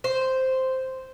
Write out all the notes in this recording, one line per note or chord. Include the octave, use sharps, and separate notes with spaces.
C5